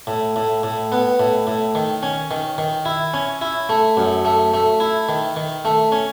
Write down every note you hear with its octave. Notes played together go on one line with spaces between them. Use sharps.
A2
A2
A2
B3
A2
A2
D#3
C#4
D#3
D#3
E4
C#4
E4
A3
F#2
A3
A3
E4
D#3
D#3
A3
C#4